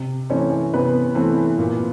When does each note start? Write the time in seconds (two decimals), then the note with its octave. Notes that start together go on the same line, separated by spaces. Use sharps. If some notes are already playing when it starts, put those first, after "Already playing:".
Already playing: C3
0.30 E3 A3 C4 C#4 C#5
0.74 C3 B3 B4
1.15 E3 A3 C4
1.58 A#2